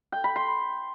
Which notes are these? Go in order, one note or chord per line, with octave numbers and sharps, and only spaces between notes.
G5
B5
C6